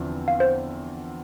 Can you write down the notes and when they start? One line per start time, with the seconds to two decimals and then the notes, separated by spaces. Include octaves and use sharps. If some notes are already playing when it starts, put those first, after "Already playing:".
Already playing: E2 D3 F3 C4
0.28 F5
0.40 C5